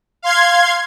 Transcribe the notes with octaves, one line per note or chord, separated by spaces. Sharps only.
F5 C6 G#6